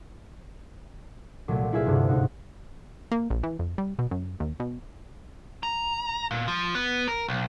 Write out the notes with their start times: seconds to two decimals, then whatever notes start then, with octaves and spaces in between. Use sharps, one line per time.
1.48 C2 A#2 F#3 A3
1.72 F#3 E4 F4 G#4 B4 E5
1.86 D2 G2 C3
2.08 G#2 D#4 F#4
3.12 A#3
3.30 A#1
3.43 E3
3.59 F2
3.78 G3
3.99 B2
4.11 F#2
4.40 D#2
4.60 B2
5.63 A#5
6.31 A#2
6.48 F3
6.75 B3
7.08 A#4
7.29 B1